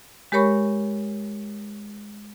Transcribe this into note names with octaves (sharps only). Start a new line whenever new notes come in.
G#3 G4 A#4 C#5 B5 C#6